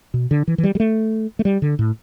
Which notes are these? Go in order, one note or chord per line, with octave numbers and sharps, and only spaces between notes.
B2
D3
E3
E3
G3
G3
A3
A3
G3
D3
A2